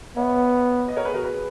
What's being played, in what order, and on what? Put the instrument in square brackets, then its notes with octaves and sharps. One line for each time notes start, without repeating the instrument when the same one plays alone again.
[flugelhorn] B3 [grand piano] C#5 E5
[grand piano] B4 D#5
A#4 C#5
G#4 B4
F#4 A#4
G#4 B4